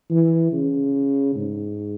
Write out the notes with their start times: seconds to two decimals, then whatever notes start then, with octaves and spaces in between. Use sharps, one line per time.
0.10 E3
0.52 C#3
1.35 G#2